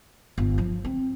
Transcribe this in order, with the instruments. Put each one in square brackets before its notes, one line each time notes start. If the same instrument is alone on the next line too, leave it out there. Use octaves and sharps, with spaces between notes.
[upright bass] G1
F3
C4